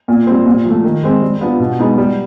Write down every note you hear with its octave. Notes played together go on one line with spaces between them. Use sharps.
A#2
G3 C4
A#2
F3 A3
D#3
G#3 C4
G3
B3 D4 F4
B2
G#3 B3 D#4
G3